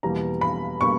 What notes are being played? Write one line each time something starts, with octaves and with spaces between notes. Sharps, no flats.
E2 B2 G3 A#3 A#5
B5
B2 G3 A#3 C#6